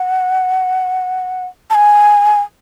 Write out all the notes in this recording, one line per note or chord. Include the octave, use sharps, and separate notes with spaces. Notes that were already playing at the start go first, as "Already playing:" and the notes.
Already playing: F#5
A5
G#5